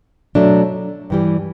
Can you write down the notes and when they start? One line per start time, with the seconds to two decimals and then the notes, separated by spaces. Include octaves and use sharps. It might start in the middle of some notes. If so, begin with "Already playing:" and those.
0.35 B2 F#3 A3 D4
1.10 G2 E3 G3